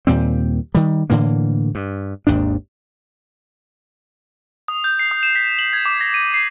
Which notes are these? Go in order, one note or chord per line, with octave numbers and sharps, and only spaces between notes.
D#2 A#2 G3 C4
D#3 G3
A2 D3 E3 A#3
G2
G#1 D#2 G#2 D4
D#6
G6
C7
D#6
E7
B6
F#7
G#6
D6
A#6
D#7
C7